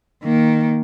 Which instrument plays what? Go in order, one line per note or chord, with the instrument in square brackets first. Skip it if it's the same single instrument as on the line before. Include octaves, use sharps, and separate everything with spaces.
[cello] D#3 A#3